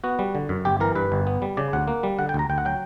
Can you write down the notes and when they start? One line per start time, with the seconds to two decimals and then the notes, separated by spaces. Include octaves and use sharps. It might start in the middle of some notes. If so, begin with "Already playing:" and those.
0.04 B3 F#4
0.19 G3
0.35 D3
0.49 F#2
0.65 G1 G4
0.80 E3 A#4
0.95 G2 B4
1.12 G1
1.27 B3
1.42 G3
1.57 C#3 D5
1.73 D2 F#5
1.88 A#3
2.03 G3
2.19 D3 F#5
2.29 G5
2.34 D2 A#5
2.50 D2 G5
2.58 F#5
2.65 F#3 G5